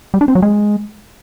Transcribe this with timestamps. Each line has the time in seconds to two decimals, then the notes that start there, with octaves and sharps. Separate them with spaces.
0.14 G3
0.21 D4
0.28 C4
0.35 F#3
0.42 G#3